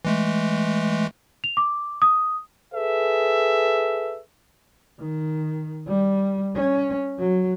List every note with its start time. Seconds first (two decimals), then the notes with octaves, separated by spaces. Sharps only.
0.05 E3 G#3 A3
1.44 F7
1.57 D6
2.02 D#6
2.73 G#4 A4 B4 E5
5.00 D#3
5.88 G3
6.55 C#4
7.18 F#3